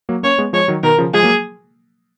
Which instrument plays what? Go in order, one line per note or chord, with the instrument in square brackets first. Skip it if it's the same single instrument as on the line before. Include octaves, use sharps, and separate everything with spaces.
[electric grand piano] F#3 A#3
[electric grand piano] A#3 C#4 [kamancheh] C#5
[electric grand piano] G#3 B3
[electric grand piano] F3 G#3 [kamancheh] C#5
[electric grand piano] D#3 F#3
[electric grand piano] B2 D#3 [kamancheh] A#4
[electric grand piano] C#3 F3
[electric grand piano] F3 G#3 [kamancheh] G#4
[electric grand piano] F#3 A#3